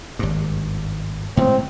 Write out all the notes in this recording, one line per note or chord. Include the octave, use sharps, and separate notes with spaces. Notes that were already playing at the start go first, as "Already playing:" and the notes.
G#1 G2
A2 C#3 G#3 C4